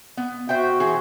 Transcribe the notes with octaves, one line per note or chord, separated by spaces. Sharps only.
B3
F#4 C5 E5 G5
E3 G#4 C5